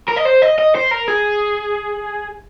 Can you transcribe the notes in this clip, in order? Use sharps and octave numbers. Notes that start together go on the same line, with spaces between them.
A#4
D#5
C5
D#5
D#5
C5
A#4
G#4